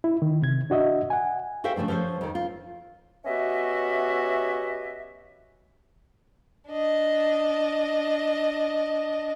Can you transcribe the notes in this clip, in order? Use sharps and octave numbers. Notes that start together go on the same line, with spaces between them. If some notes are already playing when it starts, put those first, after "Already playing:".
E4
D#3
C3 G#6
D4 F#4 D#5 E5
F#5 G#5
F#4 A4 C5 E5 F5 G5
C#3 E3 F3 A3 D4
F3 A4 A#4 C5 C#5
F2 D#3
F4
B3 C#4 F#4 G4 D#5 E5
D4 D#5